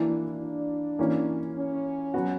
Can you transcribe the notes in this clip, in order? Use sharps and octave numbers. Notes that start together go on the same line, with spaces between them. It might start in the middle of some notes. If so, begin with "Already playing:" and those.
Already playing: E3 A#3 D4 E4
D4
E3 A#3 C#4
C#4
F#3 B3 F#4